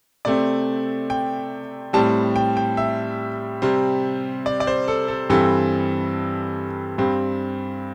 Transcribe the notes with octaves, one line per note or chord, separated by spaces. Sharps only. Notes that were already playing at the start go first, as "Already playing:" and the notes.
C3 A3 C4 D5
G5
A2 G3 C4 A5
G5
G5
E5
C3 G3 C4
D5
D5
C5
A4
A4
G2 E3 G3 C4 A4
G2 G3 C4